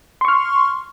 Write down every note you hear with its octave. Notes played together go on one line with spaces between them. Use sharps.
C6 C#6 F6